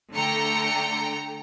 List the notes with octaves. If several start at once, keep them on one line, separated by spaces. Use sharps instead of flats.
D3 A3 G5 A#5 C#7